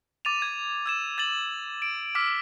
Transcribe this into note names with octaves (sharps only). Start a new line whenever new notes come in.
D6 A6 D#7 F7
G#6
E6 G#6 E7
G#6 A6 F#7
D7
D6 E6 F6 B6